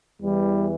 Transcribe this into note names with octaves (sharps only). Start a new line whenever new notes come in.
E2 E3 G3